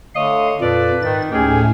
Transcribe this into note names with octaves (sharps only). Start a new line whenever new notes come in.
D3 A3 C#5 D#5 F5
F2 A#2 F4 A4 B4 D5
G#2 D#3 A6
D2 A2 A3 C#4 D#4 G4 G#4